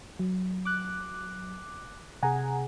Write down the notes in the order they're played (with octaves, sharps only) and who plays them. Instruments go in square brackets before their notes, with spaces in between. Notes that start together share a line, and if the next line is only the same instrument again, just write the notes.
[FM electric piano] F#3
[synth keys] D6 F#6
[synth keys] C3 G#4 [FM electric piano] F#5 G#5 A#5